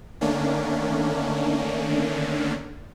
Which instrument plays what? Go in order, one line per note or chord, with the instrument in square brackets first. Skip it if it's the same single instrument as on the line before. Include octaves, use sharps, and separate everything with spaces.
[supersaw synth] D3 D#3 A3 A#3 C#4 D4